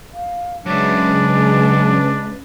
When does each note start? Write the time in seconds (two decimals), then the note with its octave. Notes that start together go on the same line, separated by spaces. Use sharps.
0.13 F5
0.66 C#3 F#3 G#3 D4 B4 E5